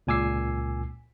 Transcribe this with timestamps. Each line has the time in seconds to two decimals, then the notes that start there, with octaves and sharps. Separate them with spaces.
0.07 C#2 A#2 G#5 D6 E6 C7